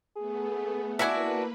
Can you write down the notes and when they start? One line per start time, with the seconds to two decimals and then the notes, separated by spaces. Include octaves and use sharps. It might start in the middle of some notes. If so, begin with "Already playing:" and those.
0.16 A3 B3 G#4
0.99 A#3 D4 E4 F#4 B4 E5 F#5 G#5